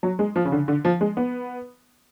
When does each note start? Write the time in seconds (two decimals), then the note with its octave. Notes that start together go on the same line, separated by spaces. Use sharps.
0.03 F#3
0.19 G#3
0.36 F3
0.45 C#3
0.52 D3
0.68 D3
0.85 F3
1.01 G#3
1.17 B3